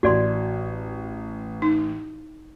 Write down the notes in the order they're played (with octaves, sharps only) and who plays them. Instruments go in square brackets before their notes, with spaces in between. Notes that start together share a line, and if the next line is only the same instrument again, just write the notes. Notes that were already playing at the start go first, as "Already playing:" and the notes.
[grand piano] A1 [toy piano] F#4 D5 C6
[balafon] D#4